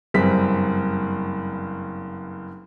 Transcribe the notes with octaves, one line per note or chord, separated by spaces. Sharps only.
F#1 G2 C4 B6